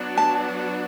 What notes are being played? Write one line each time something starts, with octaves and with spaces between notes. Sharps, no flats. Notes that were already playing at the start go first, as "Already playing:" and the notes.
Already playing: F#3 B3 D4 F#4
A5